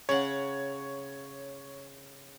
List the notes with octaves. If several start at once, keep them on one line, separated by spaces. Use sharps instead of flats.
C#3 C#5 F#5